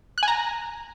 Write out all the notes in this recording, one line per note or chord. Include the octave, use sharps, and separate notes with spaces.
F#6
G#5
A#5